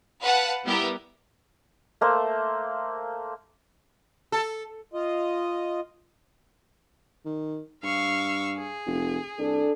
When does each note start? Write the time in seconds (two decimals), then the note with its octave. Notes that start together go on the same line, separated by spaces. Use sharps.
0.21 B4 F5 F#5 A5
0.64 G3 B3 E4 G4 A#4
2.01 A3 A#3 C5 E5
4.32 A4
4.93 F4 D#5
7.25 D#3
7.83 G2 F5 C#6 E6
8.55 G#4
8.86 F1
9.39 C2 D4 A4